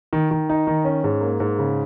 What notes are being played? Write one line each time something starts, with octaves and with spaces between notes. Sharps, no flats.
D#3
D#3
D#4
D#3
C#4
G#2
A#3
G#2
C#3